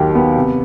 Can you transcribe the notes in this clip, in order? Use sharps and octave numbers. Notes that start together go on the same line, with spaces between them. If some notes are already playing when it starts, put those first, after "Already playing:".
Already playing: D#2 D#3 F#3 G4
B3
C3